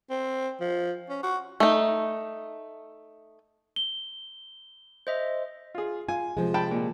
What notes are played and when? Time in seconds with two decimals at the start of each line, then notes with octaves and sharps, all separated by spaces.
0.10 C4
0.60 F3
1.09 C#4
1.23 F#4
1.60 A3 D#4
3.76 G7
5.07 C5 D#5 E5
5.75 F4 G#4
6.08 F4 G#5
6.37 C3 F3 G#3
6.54 G5 A5 B5
6.71 A#2